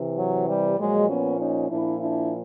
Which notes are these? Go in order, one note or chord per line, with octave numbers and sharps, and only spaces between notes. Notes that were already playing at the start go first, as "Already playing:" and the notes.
Already playing: C3 E3
F#3
G3
A#2 F3 F#3 G#3
B3 C#4
C#4 D#4
A#2 F3 D4 E4
D4 E4